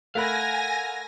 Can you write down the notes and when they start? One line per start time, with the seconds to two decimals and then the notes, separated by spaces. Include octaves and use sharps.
0.15 A3 A#4 F5 F#5 G#5 B5 A#6